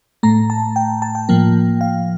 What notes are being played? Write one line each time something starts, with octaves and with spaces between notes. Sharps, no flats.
A2 A3 A#5
A5
G5
A5
G5
A2 F3 A#3
F5